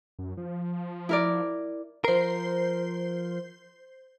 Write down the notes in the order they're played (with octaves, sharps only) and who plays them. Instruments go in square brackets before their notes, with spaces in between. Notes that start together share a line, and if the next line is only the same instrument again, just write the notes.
[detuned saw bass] F#2
F3
[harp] E4 A#4 D5
[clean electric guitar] F3 A#4 [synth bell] C5 C7